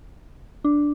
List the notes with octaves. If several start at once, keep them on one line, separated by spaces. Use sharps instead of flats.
D4